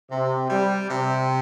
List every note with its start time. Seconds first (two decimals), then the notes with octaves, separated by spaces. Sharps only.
0.10 C3
0.50 G3
0.90 C3